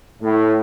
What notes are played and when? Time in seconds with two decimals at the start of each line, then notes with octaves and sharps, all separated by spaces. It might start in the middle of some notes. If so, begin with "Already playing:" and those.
0.22 A2